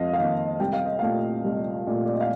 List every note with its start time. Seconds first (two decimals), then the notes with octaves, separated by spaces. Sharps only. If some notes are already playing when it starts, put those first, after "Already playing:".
Already playing: F2 D#5 F5
0.13 F5
0.18 D#3 A#3 D#5
0.60 C2 G5
0.73 F5
0.86 D#5
0.99 A#2 A3 F5
1.44 C2
1.87 A#2 A3
2.06 D5
2.14 D#5
2.21 F5